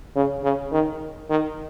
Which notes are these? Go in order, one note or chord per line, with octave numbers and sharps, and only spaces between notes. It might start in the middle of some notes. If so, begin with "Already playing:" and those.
C#3
C#3
D#3
D#3